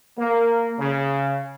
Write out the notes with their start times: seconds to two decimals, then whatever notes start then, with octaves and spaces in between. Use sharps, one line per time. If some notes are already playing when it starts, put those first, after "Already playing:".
0.18 A#3
0.79 C#3